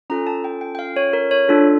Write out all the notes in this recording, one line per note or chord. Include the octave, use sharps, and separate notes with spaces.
C#4 F4 A4 A#5
A5
G5
G5
G5
F5
C#5
A#4
C#5
D4 F4 A4